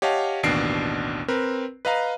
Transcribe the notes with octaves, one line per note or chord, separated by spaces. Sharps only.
G4 C#5 D#5 F5 F#5 A5
A1 D#2 B2 D4 C7 D7
C4 A#4 B4
B4 D#5 F5 A#5